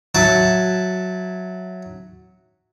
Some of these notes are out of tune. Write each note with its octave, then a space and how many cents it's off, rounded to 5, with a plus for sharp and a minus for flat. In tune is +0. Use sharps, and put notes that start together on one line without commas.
F#3 -5 E5 +0 A5 +0